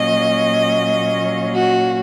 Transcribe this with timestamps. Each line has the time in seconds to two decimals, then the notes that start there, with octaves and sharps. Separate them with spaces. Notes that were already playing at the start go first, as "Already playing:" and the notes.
Already playing: A#2 F#3 A#3 C#4 D#5
1.54 F#4